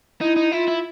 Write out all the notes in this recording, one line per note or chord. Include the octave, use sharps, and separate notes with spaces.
D#4 E4
D#4
E4 F4
E4